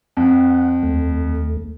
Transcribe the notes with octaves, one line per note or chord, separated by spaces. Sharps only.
F2 F#5
D#2 A3